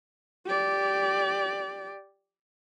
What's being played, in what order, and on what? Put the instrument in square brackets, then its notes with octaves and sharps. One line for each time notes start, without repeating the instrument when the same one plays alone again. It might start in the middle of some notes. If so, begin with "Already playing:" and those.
[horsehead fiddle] G4 D5